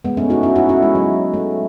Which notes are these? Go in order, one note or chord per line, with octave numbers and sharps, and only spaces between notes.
G#3 B3
A3 C#4
D#4 F#4
C#4 E4
D#4 F#4
C#4 E4
G#3
F#3
A3